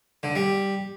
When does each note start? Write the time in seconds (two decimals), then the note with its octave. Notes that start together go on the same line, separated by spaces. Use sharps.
0.23 D3
0.35 G3